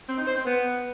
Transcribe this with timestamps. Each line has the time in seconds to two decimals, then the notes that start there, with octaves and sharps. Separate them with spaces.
0.08 C4
0.18 D#4
0.27 C5
0.36 C4
0.45 B3